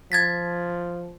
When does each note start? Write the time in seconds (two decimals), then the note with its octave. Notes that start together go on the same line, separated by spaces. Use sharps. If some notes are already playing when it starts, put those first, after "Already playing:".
0.12 F3 G#6 A6 B6